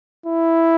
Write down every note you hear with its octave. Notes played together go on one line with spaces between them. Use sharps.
E4